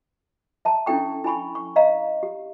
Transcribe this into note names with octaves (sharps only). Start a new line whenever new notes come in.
E5 A5 A#5
C#4 D4 E4 A4 G5 C#6
E4 G#5 B5 C#6
C#6
D#5 F5 A#5
G4